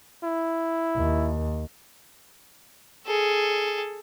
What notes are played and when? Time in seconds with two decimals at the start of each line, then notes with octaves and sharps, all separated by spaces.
0.24 E4
0.96 D#2
3.07 G#4 A4